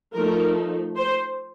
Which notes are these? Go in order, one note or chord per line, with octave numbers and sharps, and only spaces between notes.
F3 A3 D#4 A#4
C5